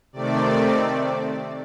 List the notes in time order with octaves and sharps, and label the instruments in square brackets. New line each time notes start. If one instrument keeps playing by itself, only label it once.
[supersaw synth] C3 D#3 A3 C4 D5